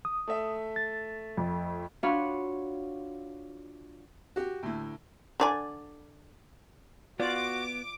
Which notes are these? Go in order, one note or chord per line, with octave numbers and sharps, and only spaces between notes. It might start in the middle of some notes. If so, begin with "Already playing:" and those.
D#6
A3 E5
A6
F2
D4 F4 F#4 C#5 F5 B5
F#4 G4
D2 A2
D3 D5 G#5
B3 F4 F#4 D5 D6